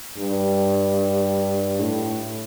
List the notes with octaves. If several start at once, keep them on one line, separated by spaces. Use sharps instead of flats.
G2
A2